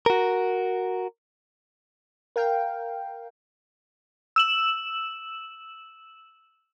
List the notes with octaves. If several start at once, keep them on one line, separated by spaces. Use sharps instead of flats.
F#4 A#4
A#4 F5 G5
E6 E7 F#7